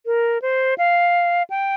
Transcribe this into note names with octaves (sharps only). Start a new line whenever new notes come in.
A#4
C5
F5
G5